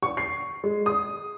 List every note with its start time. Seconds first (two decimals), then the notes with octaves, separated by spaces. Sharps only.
0.03 C#6
0.17 C7
0.64 G#3
0.86 D#6